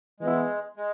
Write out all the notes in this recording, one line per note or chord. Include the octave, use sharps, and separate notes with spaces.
E3 G#3 B3 E4
G#3